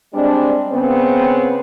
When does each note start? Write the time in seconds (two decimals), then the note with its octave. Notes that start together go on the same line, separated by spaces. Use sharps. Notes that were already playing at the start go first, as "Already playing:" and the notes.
0.15 G3 G#3 C4 D4
0.71 C#3 B3 C4